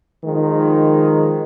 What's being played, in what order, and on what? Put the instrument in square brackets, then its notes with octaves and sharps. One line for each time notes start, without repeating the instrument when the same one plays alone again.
[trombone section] D#3 F3 G#3